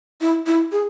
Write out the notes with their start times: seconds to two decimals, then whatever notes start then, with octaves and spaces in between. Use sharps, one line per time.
0.21 E4
0.47 E4
0.72 G#4